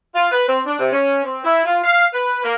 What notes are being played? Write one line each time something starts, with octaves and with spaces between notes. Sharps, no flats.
F4
B4
C4
D4
C3
C#4
C4
E4
F4
F5
B4
A#3